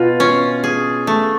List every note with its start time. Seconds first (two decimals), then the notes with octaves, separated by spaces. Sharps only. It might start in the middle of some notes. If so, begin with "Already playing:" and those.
Already playing: B2 F4
0.20 C#4
0.64 G#4
1.07 A3